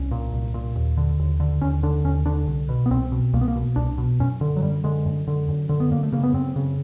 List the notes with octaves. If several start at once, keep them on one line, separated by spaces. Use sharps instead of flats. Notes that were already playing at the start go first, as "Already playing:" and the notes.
Already playing: C2 C#4
A#2
C2
A#2
D#2
D3
D#2
D3
D#2 C#4
D3 D4
D#2 C#4
D3 D4
C2
B2
B3
C2 C4
B2
C2 A#3
B3
A#3
B2
C2 D4
B2
F#2 C#4
D3
F#3
F#2 G3
D3 G#3
F#2
D3
F#2
D3
B3
F#2 A#3
A3
C#3 A#3
B3
F#2 C4
C#3